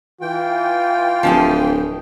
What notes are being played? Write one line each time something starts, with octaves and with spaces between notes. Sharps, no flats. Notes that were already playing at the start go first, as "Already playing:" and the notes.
E3 F4 G5
D1 F3 G4 G#4